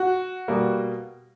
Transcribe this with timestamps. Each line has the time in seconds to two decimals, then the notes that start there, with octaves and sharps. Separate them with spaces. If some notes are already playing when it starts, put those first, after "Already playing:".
Already playing: F#4
0.48 B2 G3 A#3